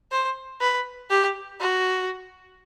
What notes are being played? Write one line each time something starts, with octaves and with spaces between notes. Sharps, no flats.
C5
B4
G4
F#4